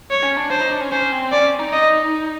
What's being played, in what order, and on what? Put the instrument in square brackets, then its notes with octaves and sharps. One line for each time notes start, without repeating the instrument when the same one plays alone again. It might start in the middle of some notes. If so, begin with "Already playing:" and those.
[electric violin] C#5
[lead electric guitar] C#4
D4
[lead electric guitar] D4 [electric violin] C5
[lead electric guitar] D#4
D4
C#4
[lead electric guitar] C#4 [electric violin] C5
[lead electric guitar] C4
[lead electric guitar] C#4 [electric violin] D5
[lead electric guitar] D#4
[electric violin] D#5